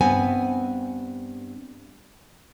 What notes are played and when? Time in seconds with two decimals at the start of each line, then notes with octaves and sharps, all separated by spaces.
0.01 G2 B3 C4 G#5